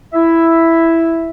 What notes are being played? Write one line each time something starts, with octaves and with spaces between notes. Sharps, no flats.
E4 E5